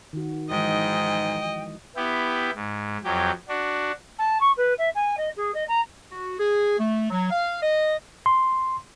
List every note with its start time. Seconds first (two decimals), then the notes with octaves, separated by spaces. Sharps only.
0.13 D#3 F#4
0.50 G#2 E3 F3 G#3 D#5 G5
1.96 B3 E4 G4
2.55 G#2
3.04 F2 F#3 G4
3.48 D4 F#4
4.18 A5
4.40 C#6
4.57 B4
4.78 E5
4.95 G#5
5.17 D#5
5.36 G#4
5.54 D#5
5.68 A#5
6.11 F#4
6.39 G#4
6.78 A3
7.10 F#3
7.30 F5
7.61 D#5
8.26 C6